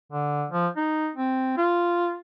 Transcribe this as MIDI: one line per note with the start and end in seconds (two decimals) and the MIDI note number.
0.12 0.45 50
0.50 0.68 53
0.77 1.10 63
1.15 1.55 60
1.57 2.17 65